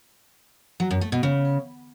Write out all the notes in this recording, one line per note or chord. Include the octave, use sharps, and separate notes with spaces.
F#3
F#2
A3
B2
C#3